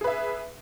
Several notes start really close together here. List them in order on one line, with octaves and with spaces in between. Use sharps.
G#4 B4 E5